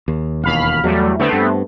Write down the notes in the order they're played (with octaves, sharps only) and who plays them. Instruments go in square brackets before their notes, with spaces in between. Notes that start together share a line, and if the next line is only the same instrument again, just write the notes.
[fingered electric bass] D#2
[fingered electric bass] E1 D#2 [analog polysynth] F5 B5 F6
[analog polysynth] E2 G3 A3 [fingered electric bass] F#3
[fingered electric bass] D3 [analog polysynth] A3 B3 C4
[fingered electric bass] G2